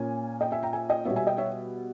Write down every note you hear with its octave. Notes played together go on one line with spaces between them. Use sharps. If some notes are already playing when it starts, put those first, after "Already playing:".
Already playing: A#2 A#3 C#4 G#5
D#5 G5
E5 G#5
G5 A#5
E5 G#5
D#5 G5
B2 G3 B3 C#5 E5
E5 G#5
D#5 G5
C#5 E5